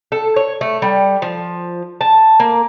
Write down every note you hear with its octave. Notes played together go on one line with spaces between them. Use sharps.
A4
C#5
A3
G3
F3
A5
A#3